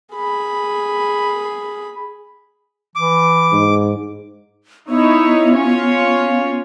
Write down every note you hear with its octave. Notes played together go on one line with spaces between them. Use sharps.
G#4 B5
E3 D6
G#2
B3 D#4 E4 C#5
C#4 F4 C#5